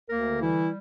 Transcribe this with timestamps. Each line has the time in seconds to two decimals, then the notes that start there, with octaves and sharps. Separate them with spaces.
0.08 D2 A#3 A#4
0.25 D3
0.41 E3 G3 E4